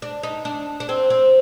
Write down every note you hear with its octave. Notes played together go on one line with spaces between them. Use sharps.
D4
D#4
D4
D4
C4
C4